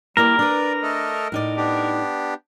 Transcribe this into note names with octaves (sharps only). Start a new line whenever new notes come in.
G3 A#3 E4 A#4 D5
D4 B4 D5
A3 A4 D#5
A2 D#4 D5
B3 D4 G4